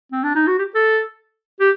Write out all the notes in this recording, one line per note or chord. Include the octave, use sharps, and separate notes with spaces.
C4
D4
D#4
F#4
G4
A4
G4